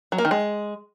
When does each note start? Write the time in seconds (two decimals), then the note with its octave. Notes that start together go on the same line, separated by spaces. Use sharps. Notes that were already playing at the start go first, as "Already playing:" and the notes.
0.12 F#3
0.18 A#3
0.25 D#3
0.31 G#3